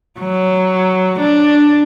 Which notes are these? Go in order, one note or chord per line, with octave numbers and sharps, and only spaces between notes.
F#3
D4